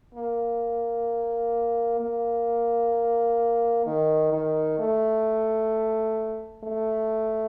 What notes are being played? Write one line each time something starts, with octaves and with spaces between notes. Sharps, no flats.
A#3
A#3
D#3
D#3
A3
A3